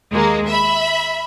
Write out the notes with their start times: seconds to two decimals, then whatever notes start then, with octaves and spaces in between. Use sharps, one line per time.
0.11 D#2 G#3 A#3
0.48 E5 B5